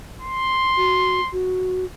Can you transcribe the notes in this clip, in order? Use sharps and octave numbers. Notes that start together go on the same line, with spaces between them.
C6
F#4
F#4